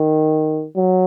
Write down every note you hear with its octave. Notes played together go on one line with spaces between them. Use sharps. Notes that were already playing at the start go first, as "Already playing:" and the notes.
Already playing: D#3
F#3